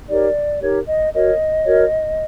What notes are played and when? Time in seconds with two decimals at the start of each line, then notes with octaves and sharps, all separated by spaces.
0.08 D#4 G4 A#4 C#5 D5
0.61 D#4 G4 A#4 C#5
0.87 D#5
1.13 F#4 A#4 C#5 D#5
1.66 F#4 A#4 C#5